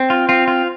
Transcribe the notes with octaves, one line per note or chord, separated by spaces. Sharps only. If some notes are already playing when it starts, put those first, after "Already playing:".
Already playing: C4
F4
C4 F4
F4